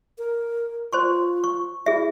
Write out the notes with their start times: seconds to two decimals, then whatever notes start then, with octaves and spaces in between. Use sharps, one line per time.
0.18 A#4
0.93 F4 C5 C6 C#6
1.44 C#6
1.86 E4 G#4 E5